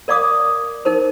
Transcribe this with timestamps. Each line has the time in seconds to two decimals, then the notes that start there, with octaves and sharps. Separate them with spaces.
0.08 A#4 D5 F5 D6 D#6
0.85 D#4 A#4 C5